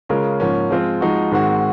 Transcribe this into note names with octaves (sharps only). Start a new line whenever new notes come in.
C#3 G#3 C#4 F4 A#4
G#2 F3 A#3 C#4
F3 G#3 C4 F4
F3 G#3 D#4 F#4
G#2 D#3 G#3 C4 F#4